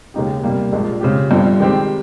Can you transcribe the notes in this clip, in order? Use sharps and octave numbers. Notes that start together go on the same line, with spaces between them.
D#2 C#3 G#3 D#4 G4
C3 G3 A#3
A#1 A#2 F3 G#3
C#3 G#3 C4 G4
G1 G2 F3 C4
D#3 G#3 C4 G4